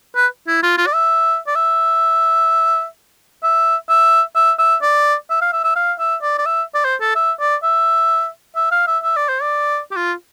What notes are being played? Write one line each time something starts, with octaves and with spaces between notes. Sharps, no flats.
B4
E4
F4
F4
D5
E5
D5
E5
E5
E5
E5
E5
D5
E5
F5
E5
E5
F5
E5
D5
D5
E5
D5
C5
A4
E5
D5
E5
E5
F5
E5
E5
D5
C5
D5
G4
F4